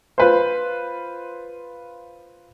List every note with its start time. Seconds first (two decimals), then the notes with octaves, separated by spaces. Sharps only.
0.18 F4 B4 C5